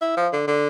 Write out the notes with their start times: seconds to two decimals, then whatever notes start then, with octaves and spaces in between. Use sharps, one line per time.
0.02 E4
0.17 F3
0.33 D3
0.48 D3